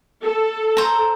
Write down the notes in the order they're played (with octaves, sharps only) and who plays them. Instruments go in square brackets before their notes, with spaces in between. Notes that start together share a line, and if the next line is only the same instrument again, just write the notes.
[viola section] A4
[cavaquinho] C5 A#5